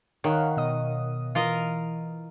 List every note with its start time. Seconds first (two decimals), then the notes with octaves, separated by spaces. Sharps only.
0.24 D#3 C#5 F5 F#5
0.57 B2 D#5 D#6
1.35 E3 F4 A#4 D#5